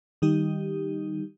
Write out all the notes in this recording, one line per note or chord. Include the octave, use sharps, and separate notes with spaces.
D#3 G3 D#4 G4